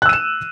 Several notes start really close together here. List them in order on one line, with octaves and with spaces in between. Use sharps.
F#6 E6 D#7 E7